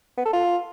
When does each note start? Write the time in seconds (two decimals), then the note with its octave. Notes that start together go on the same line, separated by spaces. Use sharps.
0.17 B3
0.25 A4
0.33 F4